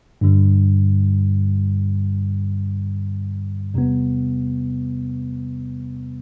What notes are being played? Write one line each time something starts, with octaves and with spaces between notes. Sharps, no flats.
G2 D3 G3
E2 C3 G3 B3